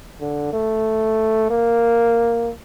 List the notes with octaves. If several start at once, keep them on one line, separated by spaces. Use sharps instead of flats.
D3
A3
A#3